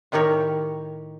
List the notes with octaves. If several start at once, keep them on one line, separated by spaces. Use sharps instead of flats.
A2 D#3 G4 A#4 C#5